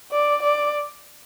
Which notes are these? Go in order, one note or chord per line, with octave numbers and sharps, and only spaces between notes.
D5
D5